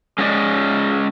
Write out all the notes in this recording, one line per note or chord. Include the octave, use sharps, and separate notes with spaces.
G#3 C#4 D#4 G4 D5 D#5